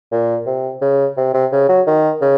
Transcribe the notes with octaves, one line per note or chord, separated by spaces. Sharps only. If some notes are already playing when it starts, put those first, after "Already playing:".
A#2
C3
C#3
C3
C3
C#3
F#3
D#3
C#3